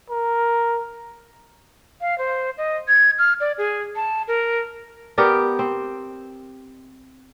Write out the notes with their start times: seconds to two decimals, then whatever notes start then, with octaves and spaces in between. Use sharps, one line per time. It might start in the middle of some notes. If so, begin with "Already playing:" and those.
0.10 A#4
2.01 F5
2.18 C5
2.58 D#5
2.88 G#6
3.19 F6
3.40 D5
3.58 G#4
3.96 A5
4.28 A#4
5.18 B3 G4 A#4 D5
5.59 C4